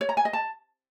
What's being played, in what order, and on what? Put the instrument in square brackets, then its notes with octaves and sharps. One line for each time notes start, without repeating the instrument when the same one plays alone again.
[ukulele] C#5
A#5
G#5
D#5
A5